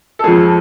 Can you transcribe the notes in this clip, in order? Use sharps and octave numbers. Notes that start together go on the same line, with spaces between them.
A4
F2 F3 G#3 G#4